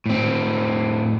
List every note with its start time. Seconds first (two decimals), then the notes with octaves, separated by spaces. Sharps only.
0.06 A2 C4